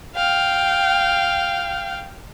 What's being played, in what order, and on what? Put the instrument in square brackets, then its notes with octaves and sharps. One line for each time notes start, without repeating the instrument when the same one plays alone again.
[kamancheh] F5 G5